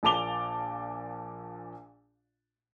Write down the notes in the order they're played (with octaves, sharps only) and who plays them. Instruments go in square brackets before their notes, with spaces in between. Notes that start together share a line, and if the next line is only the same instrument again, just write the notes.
[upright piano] A#1 A#2 A5 D6 F7 G7